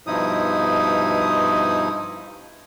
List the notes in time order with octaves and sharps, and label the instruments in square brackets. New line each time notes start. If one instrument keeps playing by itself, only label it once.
[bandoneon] G2 B2 F3 D#4 E4 D#6